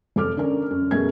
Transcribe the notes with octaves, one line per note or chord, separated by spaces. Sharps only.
F1 A4 D6 F6
D3 C#4 A#4
F#2
F#2 B2 A3 G#4 A#4 G#6